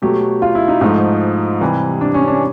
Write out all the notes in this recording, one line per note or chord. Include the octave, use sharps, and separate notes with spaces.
B2 F#3 A3 G4
F4
E4
D#4
G#2 F3 A3 D#4
C3 E3 G3
D4
C#4
D4